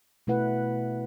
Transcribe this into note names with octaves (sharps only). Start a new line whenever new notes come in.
B2 A3 E4 B4 F#5